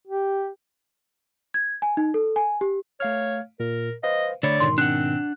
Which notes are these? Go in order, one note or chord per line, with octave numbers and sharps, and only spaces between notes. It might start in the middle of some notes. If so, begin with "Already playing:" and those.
G4
G#6
G#5
D#4
A4
G#5
G4
A3 C#5 F5 F6
A#2 A#4
B4 C5 D#5 F5
D3 A3 C#5 D5 B5
G#2 B2 D#3 C6
C4 D4 F#5 F#6